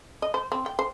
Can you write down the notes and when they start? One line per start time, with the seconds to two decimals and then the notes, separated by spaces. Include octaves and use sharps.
0.22 D#5
0.34 C5
0.52 C4
0.66 G5
0.79 C5